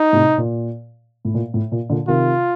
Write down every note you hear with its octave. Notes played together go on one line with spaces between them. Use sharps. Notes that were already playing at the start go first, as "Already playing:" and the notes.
Already playing: D#4
A2 C3
A#2
A2
A#2
A2
A#2
A#2 D3
C3 D#3 F4